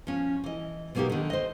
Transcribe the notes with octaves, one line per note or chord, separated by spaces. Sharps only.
F3 C#4
E3 D#5
B2 F#3 A#3 B3 D#4 G4
D3 D#3
C5 D#5